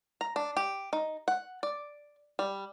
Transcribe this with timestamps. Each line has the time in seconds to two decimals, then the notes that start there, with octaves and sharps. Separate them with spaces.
0.21 A#5
0.36 D4
0.57 G4
0.93 D#4
1.28 F#5
1.63 D5
2.39 G3